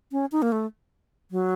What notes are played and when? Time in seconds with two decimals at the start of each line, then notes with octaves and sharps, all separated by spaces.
0.12 C#4
0.32 D#4
0.42 A#3
0.52 A3
1.31 F#3